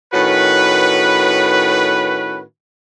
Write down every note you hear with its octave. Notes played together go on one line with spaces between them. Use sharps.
A2 D#3 C#4 F#4 B4